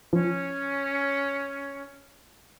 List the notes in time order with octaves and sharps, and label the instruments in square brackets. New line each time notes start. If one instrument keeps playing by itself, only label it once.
[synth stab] F3 [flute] C#4